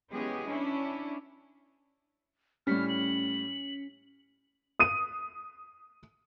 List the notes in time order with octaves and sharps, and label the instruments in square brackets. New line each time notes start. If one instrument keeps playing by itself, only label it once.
[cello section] E3 G#3 B3 C#4 G4 G#4
C#4 D4 E4
[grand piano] A2 G3 [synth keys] C#4 B6 C#7 [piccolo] F6
[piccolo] F#7
[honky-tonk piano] D#6 D#7